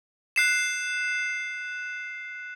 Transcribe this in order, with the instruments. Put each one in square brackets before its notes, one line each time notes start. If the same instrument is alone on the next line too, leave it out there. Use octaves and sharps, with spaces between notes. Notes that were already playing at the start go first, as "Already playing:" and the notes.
[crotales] F#6 C7 E7